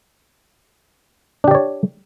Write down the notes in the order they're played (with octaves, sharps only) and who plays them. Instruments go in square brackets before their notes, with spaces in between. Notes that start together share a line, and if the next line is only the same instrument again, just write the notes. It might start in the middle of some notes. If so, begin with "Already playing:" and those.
[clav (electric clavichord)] D4
G4
D5
C#5